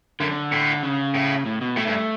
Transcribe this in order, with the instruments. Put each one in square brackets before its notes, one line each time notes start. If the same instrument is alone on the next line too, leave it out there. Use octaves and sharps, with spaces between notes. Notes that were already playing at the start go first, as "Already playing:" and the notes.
[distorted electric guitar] F#2 [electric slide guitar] D3
[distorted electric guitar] A2
[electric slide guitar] C#3
[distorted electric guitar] A2
[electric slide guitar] A2
B2
[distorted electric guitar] A2 [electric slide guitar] A3
[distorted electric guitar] G2